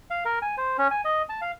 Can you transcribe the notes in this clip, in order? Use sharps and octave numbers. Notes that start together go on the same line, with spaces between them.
F5
A#4
G#5
C5
C#4
G#5
D#5
A5
F5